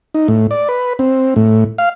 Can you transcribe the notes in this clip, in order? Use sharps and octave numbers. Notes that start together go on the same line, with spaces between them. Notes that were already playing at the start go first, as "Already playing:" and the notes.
D#4
A2
D5
B4
C4
A2
F5